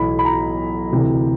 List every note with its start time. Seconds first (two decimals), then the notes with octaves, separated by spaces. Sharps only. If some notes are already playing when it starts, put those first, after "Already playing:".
Already playing: B1 A2 E3 B5
0.19 B5
0.25 A#5
0.91 D2 C3 E3